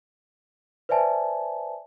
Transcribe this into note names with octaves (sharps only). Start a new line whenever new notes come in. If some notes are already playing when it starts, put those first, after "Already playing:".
B4 C5 D5 E5 G#5 A5